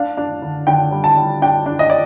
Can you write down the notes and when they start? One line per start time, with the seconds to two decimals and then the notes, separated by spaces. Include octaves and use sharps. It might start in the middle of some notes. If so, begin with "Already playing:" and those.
Already playing: D4 F5
0.17 D4
0.42 D3
0.67 D3 G5
0.91 G3
1.04 A5
1.17 G3
1.42 D4 G5
1.66 D4
1.79 D#5
1.90 D5